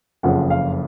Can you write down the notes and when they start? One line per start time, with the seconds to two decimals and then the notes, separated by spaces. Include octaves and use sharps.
0.23 F#1 F2 C#3 F3 F#5
0.50 F5